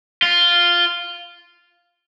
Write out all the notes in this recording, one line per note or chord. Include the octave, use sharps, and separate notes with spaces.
F4